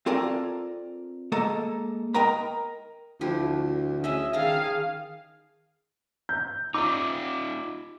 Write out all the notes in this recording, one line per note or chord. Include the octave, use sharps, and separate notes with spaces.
C4 F4 A4 A#4 D5 G#5
G#3 A#3 A4 D#5 A#5
A#4 D#5 G5 A#5 B5
D2 F3 E4 G4
C#4 G#4 D#5 E5
D#3 G#4 F5 A5 A#5
G6
D#4 F4 D6